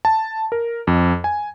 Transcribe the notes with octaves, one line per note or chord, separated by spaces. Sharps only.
A5
A#4
F2
G#5